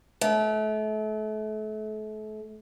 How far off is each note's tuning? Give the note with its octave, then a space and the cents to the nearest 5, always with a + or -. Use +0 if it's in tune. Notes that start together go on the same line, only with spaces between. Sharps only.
A3 -35